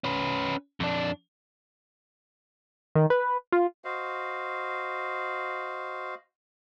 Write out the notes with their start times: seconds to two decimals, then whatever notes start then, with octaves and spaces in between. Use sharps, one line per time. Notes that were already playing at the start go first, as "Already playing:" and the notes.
0.04 C#4 B4
0.80 F2 D4
2.95 D#3
3.10 B4
3.52 F4
3.85 F#4 C5 D#5 F5